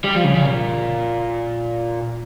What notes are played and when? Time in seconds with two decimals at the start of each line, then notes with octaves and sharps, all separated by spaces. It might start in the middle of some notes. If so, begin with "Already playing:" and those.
0.04 G3
0.15 F3
0.24 C#3
0.35 C#3
0.45 A#2